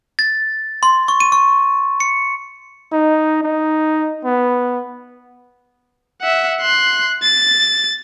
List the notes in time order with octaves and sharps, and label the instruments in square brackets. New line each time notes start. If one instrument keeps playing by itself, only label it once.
[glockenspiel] A6
C6
C#6
D#7
C#6
C#7
[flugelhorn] D#4
D#4
B3
[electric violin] E5 F#5
C6 F#6
A6